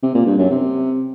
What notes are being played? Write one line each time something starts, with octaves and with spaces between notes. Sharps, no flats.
C3
A#2
G2
F#2
C3